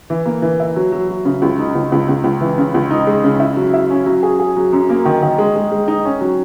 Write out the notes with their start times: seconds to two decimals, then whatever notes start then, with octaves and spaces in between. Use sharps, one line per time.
0.10 E3
0.26 A#3
0.42 E3
0.60 E4
0.76 F#3
0.92 F#3
1.09 F#3
1.25 C#3
1.42 C#2
1.59 D#4
1.75 C#2
1.92 C#2
2.09 C#2
2.24 C#2
2.41 E3
2.58 C#3
2.74 C#2
2.91 D#4
3.07 G#3
3.24 C#3
3.40 E4
3.57 F#3
3.74 E4
3.90 C#4
4.06 F#3
4.23 G#4
4.40 G#4
4.57 F#3
4.73 F#2
4.90 A#3
5.05 D#3
5.22 D#3
5.38 G#3
5.56 G#3
5.72 G#3
5.88 D#4
6.05 C#4
6.21 F#3